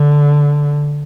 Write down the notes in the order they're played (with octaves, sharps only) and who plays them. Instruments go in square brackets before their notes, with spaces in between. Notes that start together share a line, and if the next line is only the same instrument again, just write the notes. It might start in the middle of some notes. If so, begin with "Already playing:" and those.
Already playing: [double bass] D3